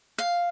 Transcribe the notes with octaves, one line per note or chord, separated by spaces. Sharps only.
F5